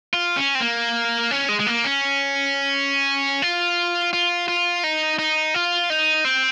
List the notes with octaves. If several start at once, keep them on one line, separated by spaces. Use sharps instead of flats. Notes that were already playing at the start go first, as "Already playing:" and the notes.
F4
C#4
C4
A#3
C#4
G#3
G#3
A#3
C#4
F4
F4
F4
D#4
D#4
F4
D#4
C4